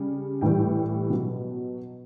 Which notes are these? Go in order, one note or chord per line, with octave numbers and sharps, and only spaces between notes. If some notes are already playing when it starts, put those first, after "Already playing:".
Already playing: C#3 G3
A2 E3 G3 G5
B2 F#3